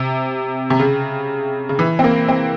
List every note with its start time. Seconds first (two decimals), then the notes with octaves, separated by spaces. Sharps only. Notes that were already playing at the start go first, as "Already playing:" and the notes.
Already playing: C3
0.70 C3
0.80 C#3
1.69 C#3
1.79 E3
1.99 C4
2.04 A#3
2.28 C4